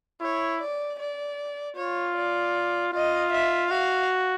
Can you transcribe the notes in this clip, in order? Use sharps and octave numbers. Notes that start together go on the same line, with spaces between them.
E4 C#5
D5
D5
F4 C#5
D5
F4 D#5
E5
F#4 F5